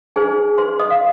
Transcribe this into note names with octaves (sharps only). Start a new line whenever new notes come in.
D#4 G#4 C5 G#5
C5 C6
D#5 D#6
F5